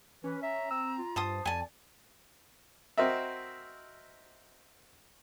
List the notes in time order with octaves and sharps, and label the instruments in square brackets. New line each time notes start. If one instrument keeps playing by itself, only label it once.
[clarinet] E3 [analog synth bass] C#4 [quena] B4
[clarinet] E5 [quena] A#5
[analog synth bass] C4 [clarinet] E6
[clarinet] F4
[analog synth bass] G2 [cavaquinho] C5 A5 D#6
[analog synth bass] F2 [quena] D5 [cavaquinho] G#5 A5
[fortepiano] C4 F#4 A#4 D#5 E5